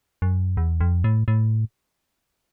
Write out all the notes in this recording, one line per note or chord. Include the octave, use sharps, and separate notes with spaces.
F#2
E2
F2
A2
A2